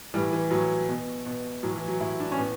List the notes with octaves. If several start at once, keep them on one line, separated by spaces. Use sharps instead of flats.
A2 E3 G3
E3
A2 E3 F#3
B2
B2
A2 E3 F#3
E3
F#3
A2 E3 E4
D4
C#4
A2 B3